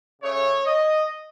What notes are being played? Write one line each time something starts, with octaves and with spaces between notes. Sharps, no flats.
C#3 A3 C#5
D#5